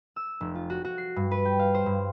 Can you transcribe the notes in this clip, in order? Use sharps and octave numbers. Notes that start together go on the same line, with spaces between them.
E6
F1
F4
F#4
F#4
C7
G2
B4
G5
F5
C5
G2